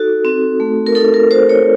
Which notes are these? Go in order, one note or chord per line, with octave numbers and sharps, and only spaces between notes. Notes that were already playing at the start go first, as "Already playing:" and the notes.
Already playing: D#4 F#4 A4
C4
A3
A#4
D#4 A4
A#4
F#4 C5
C#5